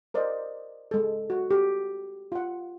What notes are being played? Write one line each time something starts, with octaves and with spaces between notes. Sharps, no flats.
A#4 C5 D5 D#5
G#3 A4
F#4
G4
F4 F#5